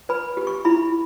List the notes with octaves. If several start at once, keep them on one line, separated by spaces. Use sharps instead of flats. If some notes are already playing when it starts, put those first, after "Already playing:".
B4 B5
G4
C#6
E4 B5